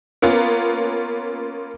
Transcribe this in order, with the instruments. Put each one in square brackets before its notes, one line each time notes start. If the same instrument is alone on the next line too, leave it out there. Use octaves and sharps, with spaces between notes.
[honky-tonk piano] A#3 B3 C#4 F4